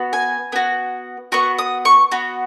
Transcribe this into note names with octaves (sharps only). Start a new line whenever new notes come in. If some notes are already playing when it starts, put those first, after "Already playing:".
Already playing: B3 F#4
G#5
B3 F#4
B3 F#4 C#6
D#6
C#6
B3 F#4